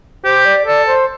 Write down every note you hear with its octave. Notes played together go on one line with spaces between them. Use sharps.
G4 C5
D5
A4 D5
C5